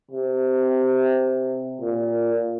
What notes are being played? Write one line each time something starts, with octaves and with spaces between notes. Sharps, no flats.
C3
A#2